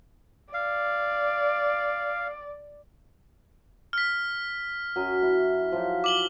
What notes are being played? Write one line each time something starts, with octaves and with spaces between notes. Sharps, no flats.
D5 F5
F6 B6
F#2 F#3 G#5
E4
F3 F#3 G4
D6 F#7 G7